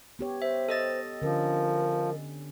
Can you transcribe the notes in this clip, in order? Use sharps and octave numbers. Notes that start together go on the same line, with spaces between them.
B3 G4 C#5
C5 E5
A4 D#5 A6
D3 F3 C#4 A#4